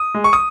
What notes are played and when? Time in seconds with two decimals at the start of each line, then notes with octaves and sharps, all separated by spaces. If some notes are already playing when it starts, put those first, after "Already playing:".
Already playing: D#6
0.14 G#3
0.24 C#6
0.33 D#6